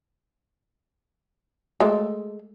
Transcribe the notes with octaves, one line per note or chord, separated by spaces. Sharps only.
G#3 A3